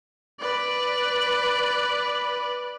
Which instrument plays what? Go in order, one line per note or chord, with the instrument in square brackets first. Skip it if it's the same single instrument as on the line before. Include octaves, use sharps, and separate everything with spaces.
[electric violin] B4 D5